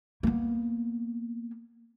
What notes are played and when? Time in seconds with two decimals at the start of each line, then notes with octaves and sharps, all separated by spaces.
0.23 A#3 B3